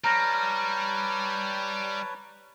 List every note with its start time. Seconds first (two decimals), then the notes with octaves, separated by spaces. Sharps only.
0.04 G3 B4 C#5 A5 A#5 F6 A#6